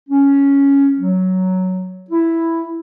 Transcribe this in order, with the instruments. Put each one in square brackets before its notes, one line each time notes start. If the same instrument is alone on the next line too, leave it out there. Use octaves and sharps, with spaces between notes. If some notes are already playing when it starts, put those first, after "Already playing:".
[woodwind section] C#4
F#3
E4